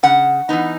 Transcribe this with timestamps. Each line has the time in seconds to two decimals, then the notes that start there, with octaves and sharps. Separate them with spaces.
0.03 C#3 F#5
0.49 E3 B3 D#4